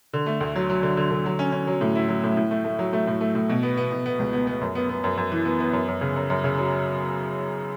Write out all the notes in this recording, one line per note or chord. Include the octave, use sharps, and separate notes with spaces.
D3
A3
D2
F#3
F#3
D3
D3
D3
F#3
C#4
C#4
F#3
A2
E4
F#3
A2
A2
A3
A3
F#3
A3
A2
A3
A2
B2
B3
B3
B2
B3
C#2
B3
B3
F#2
B3
B3
F#2
F#2
E3
B3
B3
F#2
F#2
C#3
F#2
F#2
C#3
F#3